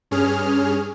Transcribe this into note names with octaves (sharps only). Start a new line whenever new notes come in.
G2 C#4 G#4 F6